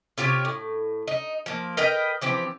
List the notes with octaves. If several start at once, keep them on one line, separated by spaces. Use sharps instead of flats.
C3 F4 G4 C#5
A2
D#4
F3 A#3
A#4 B4 D#5 G5
E3 F3 C4 G4